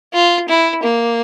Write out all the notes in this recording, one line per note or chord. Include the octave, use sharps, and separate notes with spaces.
F4
E4
A#3